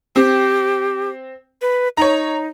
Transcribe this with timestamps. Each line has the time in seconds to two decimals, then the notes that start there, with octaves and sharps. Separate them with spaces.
0.16 C4 G4
1.62 B4
1.97 D#4 C#5 A#5